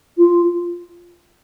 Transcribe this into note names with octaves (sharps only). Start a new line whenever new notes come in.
F4